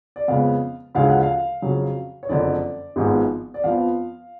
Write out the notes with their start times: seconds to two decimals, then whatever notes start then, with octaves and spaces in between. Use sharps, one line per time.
0.16 D5
0.28 F2 C#3 G#3 B3 F5
0.95 D2 C#3 F3 G#3 F5
1.09 F#5
1.23 F5
1.62 F2 C#3 F#3
2.23 C#5
2.29 F#1 F2 D3 D5
2.96 G#1 G#2 F3 G#3 B3
3.54 D5
3.64 F2 F3 B3 F5